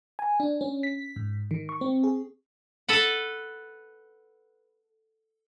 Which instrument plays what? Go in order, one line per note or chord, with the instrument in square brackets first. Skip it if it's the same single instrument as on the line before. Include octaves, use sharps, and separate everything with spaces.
[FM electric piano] G#5
D4
C#4
B6
G#2
D#3
C#6
C4
G#4
[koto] A4 B4 F#5